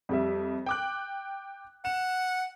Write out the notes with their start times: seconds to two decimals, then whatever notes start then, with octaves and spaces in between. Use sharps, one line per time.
0.09 F2 G3 E5
0.66 G5 D6 F#6
1.85 F#5 E7